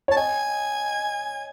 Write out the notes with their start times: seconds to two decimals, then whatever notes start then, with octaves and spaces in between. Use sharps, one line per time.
0.08 C#5 A5
0.17 D#5 G#5